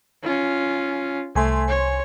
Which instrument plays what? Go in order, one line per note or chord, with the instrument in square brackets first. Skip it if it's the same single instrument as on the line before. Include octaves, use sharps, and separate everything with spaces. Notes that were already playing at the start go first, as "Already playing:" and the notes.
[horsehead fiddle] C#4 F4
[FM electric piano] C2 G#5 C6 [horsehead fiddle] A3
[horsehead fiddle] C#5